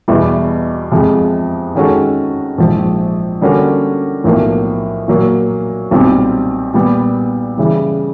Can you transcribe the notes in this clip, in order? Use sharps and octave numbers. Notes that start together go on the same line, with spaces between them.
E2 B2 G3 B3 E4
F2 C3 F3 G#3
D#3 G#3 C#4 F#4 A4
A#1 G#2 F3
D3 G3 A#3 C#4 F#4
B1 A2 F3 A#3
A#2 F#3 A#3
B1 A#2 G3 C4 F4
A#2 G3 B3
C#3 E3 G3